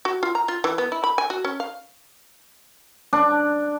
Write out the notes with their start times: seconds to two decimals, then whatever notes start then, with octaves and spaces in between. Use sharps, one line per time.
0.05 F#4
0.23 F4
0.35 A#5
0.48 F4
0.64 E3
0.78 B3
0.92 E4
1.04 B5
1.18 G#5
1.30 F#4
1.44 C#4
1.60 F5
3.13 D4